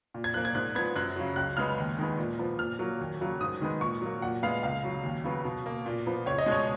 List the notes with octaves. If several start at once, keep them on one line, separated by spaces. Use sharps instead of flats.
A#2
G#6
F3 A#3 F#6
G#6
G#2 F#6
F3 B3 G#6
F#2 F#6
C#3 F#3
C#2 F#6
C#3 G#3 B3 F6
D#2
D#3 G#3 B3
A#2
F3 B3
A#2 F6
F#3 A#3
D#2
C#3 F#3 A#3
G#2 D#6
D#3 G#3 B3
A#2 C#6
F#3 A#3
A#2 F#5
G#3 B3 F5
C#2 F5
C#3 F#3
D#2
C#3 F#3 B3
B2
A#3
A#2
F3 B3
C#2 C#5
D#5
B2 G#3
C#5